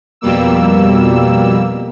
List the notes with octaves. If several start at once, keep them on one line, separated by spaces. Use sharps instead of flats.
F2 B2 G3 A#3 E6